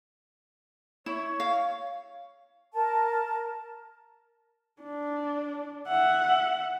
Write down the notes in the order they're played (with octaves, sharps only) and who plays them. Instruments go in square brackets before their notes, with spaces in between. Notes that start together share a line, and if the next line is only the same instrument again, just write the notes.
[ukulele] E4 [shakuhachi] C#5
[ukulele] F5
[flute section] A#4 A5
[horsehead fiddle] D4
E5 F#5